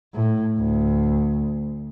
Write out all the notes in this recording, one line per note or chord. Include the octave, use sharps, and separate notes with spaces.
A2
D2